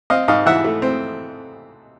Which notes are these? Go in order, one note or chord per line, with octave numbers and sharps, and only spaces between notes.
C4 D#5 F5
G#2 D#5 F5
E3 E5 F#5
A3
C4